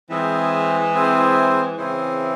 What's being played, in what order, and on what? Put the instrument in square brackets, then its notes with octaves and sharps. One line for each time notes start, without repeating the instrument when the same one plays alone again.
[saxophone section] E3 G#3 [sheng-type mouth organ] C4 E4 G#4 C5
[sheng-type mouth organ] C4 E4 G#4 C5
[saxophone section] C#3 E3 [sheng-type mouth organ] C4 E4 G#4 C5